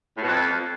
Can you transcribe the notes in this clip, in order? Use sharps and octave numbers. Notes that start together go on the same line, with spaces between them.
A2
B2
F2